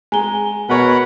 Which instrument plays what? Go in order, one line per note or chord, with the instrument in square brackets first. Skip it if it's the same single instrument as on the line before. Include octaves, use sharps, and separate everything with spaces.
[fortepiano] G#3 [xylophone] G#5 A#5 G7
[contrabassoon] B2 [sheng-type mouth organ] A#4 F#5 B5 [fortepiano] B4 C#5